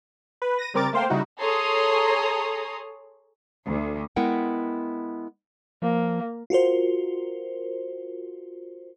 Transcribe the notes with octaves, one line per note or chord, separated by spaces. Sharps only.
B4
A#6 D#7
C#3 G3 C4 A#4 D6 A6
A3 A#3 C5 F5 G5
C#3 G3 D#4 E4 F#4
G#4 A4 C#5 A#5 C6 D#6
D2
G#3 B3 E4 A#4 F#5 G5
F3 A#3
F4 F#4 A#4 C5